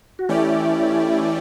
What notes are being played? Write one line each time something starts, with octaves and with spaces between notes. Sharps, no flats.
F#4
E3 A3 C#4 E4 G4 D5